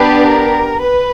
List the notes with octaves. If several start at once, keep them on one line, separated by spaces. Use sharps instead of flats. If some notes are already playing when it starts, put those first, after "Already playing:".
Already playing: B3 D4 G4 B4
A#4
B4